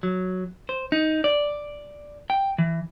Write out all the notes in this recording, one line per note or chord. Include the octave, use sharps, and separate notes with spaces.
F#3
C5
D#4
D5
G5
E3